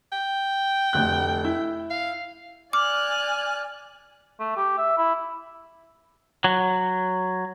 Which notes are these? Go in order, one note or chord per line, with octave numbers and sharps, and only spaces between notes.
G5
F1 D2 F#6
E4
F5
D5 G#5 D6 F6 F#6
A3
G4
E5
E4
F#3